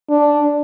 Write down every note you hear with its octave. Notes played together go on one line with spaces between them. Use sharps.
D4